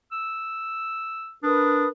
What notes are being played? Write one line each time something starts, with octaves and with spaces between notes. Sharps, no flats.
E6
D4 A#4 B4 D#6